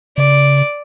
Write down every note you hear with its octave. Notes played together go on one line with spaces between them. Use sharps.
C#3 D5